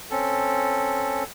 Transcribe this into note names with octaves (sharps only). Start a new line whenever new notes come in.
C4 C#4 A4